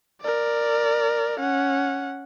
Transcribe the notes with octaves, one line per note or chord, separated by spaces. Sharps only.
A#4 D5
C#4 F#5